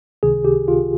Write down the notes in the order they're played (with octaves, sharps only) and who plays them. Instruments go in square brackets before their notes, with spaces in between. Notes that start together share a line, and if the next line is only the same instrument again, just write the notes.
[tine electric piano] C#2 C3 D#3 G#4
G4
F4